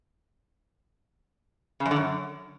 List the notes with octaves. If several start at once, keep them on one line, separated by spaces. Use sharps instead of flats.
C#3
F#2
D3
F#2